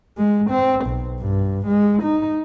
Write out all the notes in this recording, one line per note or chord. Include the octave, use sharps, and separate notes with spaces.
G#3
C4
B1
G2
G#3
D#4